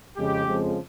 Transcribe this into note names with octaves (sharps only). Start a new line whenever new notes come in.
F2 C#3 G#3 G4
F2 C#3 F3 G#3